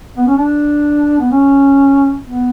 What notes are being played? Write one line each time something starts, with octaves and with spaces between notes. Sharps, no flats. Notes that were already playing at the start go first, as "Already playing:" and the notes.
B3
C#4
D4
B3
C#4
B3